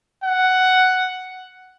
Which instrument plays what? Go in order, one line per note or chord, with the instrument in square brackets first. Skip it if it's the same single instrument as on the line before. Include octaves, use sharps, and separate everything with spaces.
[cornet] F#5